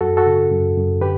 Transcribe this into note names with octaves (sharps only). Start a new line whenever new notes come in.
F#2 F#4 A4
F#4 A4
C#3
F#2
F#2
D3 G4 B4